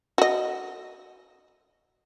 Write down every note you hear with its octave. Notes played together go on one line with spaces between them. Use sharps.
F#4 D#5